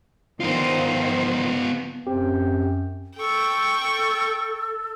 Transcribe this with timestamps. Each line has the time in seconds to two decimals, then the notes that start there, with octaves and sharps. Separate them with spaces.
0.41 D#3 F3 B3 F4 C5
2.07 F#2 C4 G4 G5
3.17 A4 G5 C#6